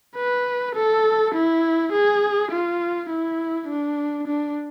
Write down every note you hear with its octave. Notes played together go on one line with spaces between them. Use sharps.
B4
A4
E4
G#4
F4
E4
D4
D4